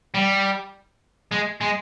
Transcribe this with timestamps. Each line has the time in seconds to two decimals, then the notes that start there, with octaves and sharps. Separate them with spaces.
0.14 G3
1.32 G#3
1.61 G#3